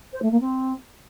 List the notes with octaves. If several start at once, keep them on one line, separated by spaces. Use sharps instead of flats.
C5
A3
A#3
C4